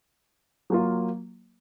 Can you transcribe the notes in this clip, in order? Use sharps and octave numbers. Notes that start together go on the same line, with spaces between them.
F#3 A#3 F4